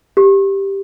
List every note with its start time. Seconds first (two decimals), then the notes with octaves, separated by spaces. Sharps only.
0.17 G4